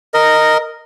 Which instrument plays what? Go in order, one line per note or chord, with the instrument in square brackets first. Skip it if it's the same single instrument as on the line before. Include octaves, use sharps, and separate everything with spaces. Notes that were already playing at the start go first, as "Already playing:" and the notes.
[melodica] A#4 D#5